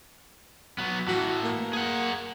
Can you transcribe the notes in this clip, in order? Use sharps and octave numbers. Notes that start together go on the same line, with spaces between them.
F#3 B3
A2 E3 F#4
A#3
G#4 F#5